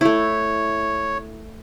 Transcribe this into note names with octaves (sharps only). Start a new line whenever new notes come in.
A3 E4 C#5